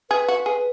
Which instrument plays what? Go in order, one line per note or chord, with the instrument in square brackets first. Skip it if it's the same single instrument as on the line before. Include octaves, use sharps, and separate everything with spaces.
[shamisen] G#4 [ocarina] B4
[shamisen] F#4
[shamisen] G#4 [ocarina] B4